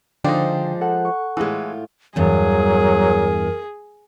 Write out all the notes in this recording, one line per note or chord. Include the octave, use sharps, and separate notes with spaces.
D3 F3 G#3 D4 D#4 C5 G5
A4 F#5
C#6
A2 E3 G#3 F4
E2 G2 F#3 G#4 A#4